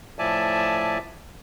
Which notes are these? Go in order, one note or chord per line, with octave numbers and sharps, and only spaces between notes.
A2 F3 D5 E5 G#5 A5